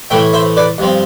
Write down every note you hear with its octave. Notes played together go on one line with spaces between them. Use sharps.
A2 E3 A3 E5 G5
C5 E5
B4 D5
G2 F3 C4